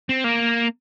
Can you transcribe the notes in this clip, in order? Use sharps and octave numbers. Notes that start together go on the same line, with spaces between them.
C4
A#3